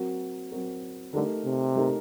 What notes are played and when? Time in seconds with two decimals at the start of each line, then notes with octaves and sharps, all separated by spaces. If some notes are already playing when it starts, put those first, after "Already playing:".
Already playing: F#3 C4 F#4 A#4
0.51 F#3 C4 F#4 A#4
1.14 D3 A3 D#4 G4 A#4
1.45 C3
1.75 A3 D#4 G4 A#4